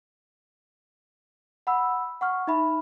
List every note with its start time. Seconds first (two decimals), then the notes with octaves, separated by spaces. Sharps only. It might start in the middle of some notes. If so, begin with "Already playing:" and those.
1.67 F#5 B5 E6
2.21 F#5 C#6 F6
2.47 D#4 E5 B5